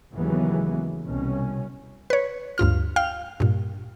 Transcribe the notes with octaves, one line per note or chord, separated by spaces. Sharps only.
D#2 C#3 E3 F#3 G#3 B3
C2 B2 C#4
B4 C#5
D2 G2 F4 F6
F5 G5 F6
G2 A#2